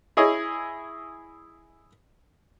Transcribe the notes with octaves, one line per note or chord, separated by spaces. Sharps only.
E4 G#4 C#5 D#5